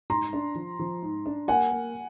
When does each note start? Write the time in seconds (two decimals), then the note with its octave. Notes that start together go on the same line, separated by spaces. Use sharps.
0.10 G#2 A#5 C6
0.33 D4
0.55 F3
0.79 F3
1.02 G#2
1.26 D4
1.48 A#3 F#5 G#5
1.71 A#3